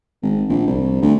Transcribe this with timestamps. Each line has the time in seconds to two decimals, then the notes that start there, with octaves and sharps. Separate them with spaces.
0.23 G#1
0.49 A#1
0.67 C2
1.02 D2